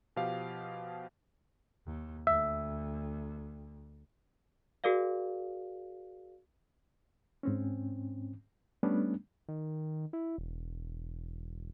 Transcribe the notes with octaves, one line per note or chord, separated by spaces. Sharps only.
B2 F3 G4 F5
D#2
D2 E5
F#4 G#4 A#4 D5 F5
G#2 C4 C#4
G3 A3 B3 C#4 D4
D#3
E4
E1